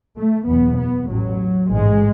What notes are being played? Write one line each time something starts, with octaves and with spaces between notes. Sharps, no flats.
A3
F#1 E2 B2 B3
B3
A1 A2 F#3
A1 G#2 G#3